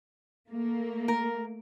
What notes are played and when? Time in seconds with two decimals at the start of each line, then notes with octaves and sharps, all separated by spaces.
0.48 A3 A#3
1.08 A#4